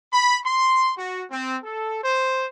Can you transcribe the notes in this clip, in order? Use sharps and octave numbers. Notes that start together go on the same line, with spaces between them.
B5
C6
F#4
C4
A4
C5